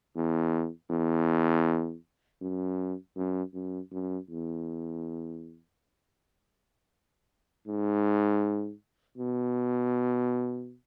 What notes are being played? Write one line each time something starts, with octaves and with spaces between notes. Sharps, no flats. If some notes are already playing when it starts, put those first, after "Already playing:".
E2
E2
F#2
F#2
F#2
F#2
E2
G#2
B2